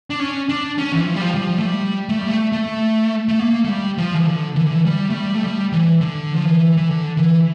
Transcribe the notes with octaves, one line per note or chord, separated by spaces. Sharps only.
D4
C#4
D4
C#4
E3
F3
G3
F3
G3
F3
A3
G3
A3
G3
A3
A3
A3
A#3
A3
G3
F3
E3
D3
E3
D3
E3
G3
A3
G3
A3
G3
E3
D3
F3
E3
E3
D3
E3